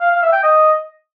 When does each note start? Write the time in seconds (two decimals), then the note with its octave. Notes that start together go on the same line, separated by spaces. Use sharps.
0.01 F5
0.11 F5
0.22 E5
0.32 G5
0.43 D#5